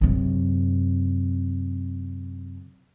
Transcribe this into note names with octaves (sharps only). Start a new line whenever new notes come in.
F#2 C3